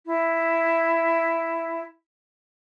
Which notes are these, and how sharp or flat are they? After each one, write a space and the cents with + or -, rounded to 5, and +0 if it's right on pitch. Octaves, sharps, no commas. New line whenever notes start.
E4 +5